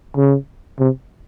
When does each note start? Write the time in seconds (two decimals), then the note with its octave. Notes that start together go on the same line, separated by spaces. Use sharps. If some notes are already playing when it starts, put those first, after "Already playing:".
0.17 C#3
0.80 C3